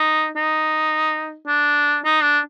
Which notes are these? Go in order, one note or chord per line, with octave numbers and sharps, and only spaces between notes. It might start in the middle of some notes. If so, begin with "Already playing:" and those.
Already playing: D#4
D#4
D4
D#4
D4